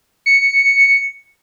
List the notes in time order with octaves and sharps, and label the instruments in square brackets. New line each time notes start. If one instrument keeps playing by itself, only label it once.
[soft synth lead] C#7